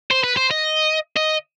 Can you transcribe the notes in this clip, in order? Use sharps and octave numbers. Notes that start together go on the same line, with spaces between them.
C5
B4
C5
D#5
D#5